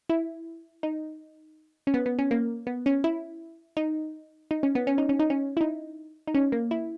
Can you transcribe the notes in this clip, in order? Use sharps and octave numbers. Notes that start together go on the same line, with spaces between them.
E4
D#4
C#4
B3
B3
C#4
A#3
B3
C#4
E4
D#4
D#4
C#4
B3
C#4
D#4
C#4
D#4
C#4
E4
D#4
D#4
C#4
A#3
E4